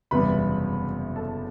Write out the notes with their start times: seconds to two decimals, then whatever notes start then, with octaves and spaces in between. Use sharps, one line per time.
0.11 F#1 E2 C3 G3 B3 B4 B5
1.16 A4 A5